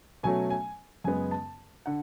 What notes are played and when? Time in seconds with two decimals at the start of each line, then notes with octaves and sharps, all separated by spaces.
0.23 B2 F#3 A3 C#4 G#5
0.50 G#5
1.04 F#2 C#3 G#3 B3 G#5
1.31 A5
1.86 D3 F#5